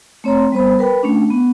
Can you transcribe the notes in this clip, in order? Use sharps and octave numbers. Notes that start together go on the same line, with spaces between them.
A3 C4 C#5 A#5 C6
G3 B3 C5 B5
A#4 B4 G5 B5
A3 C#4 D4
B3